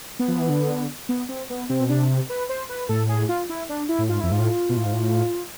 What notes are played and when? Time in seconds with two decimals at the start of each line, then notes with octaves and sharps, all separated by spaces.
0.19 B3
0.28 F3
0.39 E3
0.49 D3
1.09 B3
1.29 C4
1.50 B3
1.69 C3 C4
1.80 B2
1.90 C3 D4
2.29 B4
2.49 C5
2.69 B4
2.89 A2 A4
3.09 G#4
3.29 F4
3.49 E4
3.69 D4
3.89 E4
3.98 A2
4.09 G#2 F4
4.21 F2 E4
4.31 G#2 F4
4.39 A2
4.69 B2
4.77 A2
4.85 G#2
4.93 A2